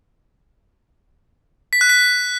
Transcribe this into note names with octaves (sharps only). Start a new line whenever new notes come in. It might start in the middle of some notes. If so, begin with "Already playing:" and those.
B6
F#6
B6